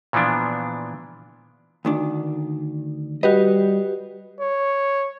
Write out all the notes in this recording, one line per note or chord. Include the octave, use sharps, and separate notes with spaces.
A#2 E3 F3 B3 D4
D2 D#3 D4
G3 F#4 G4 B4 D#5
C#5